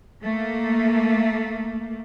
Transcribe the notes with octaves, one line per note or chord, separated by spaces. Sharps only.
A3 A#3